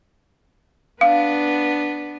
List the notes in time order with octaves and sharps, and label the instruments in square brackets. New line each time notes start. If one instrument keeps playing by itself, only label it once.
[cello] B3 D4 [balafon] F5